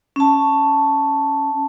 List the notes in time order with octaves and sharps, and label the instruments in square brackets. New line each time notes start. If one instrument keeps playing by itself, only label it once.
[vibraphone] C#4 A5